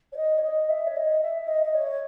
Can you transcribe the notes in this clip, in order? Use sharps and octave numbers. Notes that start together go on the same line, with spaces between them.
C#5
D#5
C#5
D#5
E5
C#5
D#5
E5
D#5
D#5
C#5